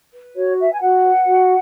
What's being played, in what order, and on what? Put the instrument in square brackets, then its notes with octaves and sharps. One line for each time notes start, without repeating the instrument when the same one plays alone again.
[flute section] B4
F#4 C#5
B4 E5
G#5
F#4 F#5
B4
F#4